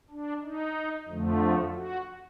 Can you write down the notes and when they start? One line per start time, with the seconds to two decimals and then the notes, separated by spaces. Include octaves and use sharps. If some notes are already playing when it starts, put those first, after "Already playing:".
0.10 D4
0.43 D#4
1.08 F2 D3 F3 A3
1.74 F#4